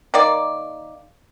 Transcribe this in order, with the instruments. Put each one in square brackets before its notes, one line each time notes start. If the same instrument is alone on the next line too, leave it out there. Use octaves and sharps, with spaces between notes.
[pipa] D#3 A#3 D5